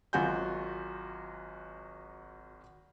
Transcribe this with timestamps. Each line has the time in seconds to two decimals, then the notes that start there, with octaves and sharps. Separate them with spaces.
0.13 G#1 F#3 F4 F#4 G#5 G6